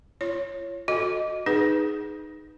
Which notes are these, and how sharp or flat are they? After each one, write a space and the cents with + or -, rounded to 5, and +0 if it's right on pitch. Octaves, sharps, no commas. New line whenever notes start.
F4 -35 C#5 +0
F#4 -25 A4 +0 D#5 +0
D#4 -5 G#4 +0 B4 +5